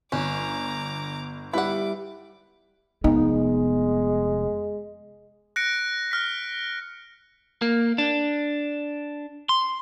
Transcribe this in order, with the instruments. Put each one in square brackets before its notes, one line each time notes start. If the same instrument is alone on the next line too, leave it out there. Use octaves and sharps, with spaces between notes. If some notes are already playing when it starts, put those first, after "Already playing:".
[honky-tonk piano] G1 [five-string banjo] C#4 [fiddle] A#5 D6
[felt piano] G3 E4 [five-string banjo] B4 F#5 [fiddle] D6
[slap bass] F1 [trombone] G#3 [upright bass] B3 [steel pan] D#4
[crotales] F#6 A#6 C#7 D7
F6 B6
[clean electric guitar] A#3
D4
C6